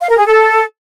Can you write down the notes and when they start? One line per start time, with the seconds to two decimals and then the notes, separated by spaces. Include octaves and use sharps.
0.01 F5
0.09 A#4
0.18 G#4
0.26 A4